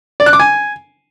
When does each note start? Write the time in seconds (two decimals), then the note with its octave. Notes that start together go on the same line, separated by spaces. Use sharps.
0.20 D5
0.26 F#6
0.33 D6
0.40 G#5